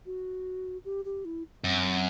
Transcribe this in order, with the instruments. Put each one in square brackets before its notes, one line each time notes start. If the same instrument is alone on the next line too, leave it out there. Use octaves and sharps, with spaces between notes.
[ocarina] F#4
G4
G4
E4
[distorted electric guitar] F#2 [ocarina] C4